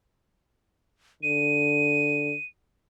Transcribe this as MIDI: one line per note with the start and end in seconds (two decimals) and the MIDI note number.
1.23 2.34 50
1.23 2.44 99